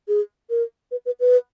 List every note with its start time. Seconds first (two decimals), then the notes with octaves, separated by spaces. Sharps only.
0.08 G#4
0.50 A#4
0.91 B4
1.06 B4
1.20 B4